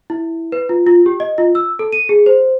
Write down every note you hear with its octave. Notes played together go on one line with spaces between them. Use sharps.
E4
B4
F4
F4
G4
D#5
F4
E6
A4
D#7
G#4
C5